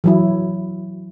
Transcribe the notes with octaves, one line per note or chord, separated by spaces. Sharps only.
E3 F#3 E4